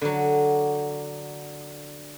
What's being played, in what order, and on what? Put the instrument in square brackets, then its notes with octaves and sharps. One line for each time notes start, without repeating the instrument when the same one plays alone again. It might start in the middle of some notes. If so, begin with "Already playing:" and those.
[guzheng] D3 F#3